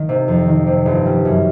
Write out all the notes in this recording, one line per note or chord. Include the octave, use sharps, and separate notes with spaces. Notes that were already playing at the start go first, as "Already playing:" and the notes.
Already playing: D#3
C3
F2
D#3
C3
G1
G3
F#2